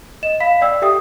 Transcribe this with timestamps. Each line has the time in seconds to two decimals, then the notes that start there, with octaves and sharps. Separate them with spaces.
0.23 D#5 E7
0.40 F5 B5 B6
0.61 D5 G5 E6
0.82 G4 A4 E5 G5 D#6